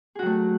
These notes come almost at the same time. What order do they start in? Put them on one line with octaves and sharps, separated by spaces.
G#4 F#4 F#3 A3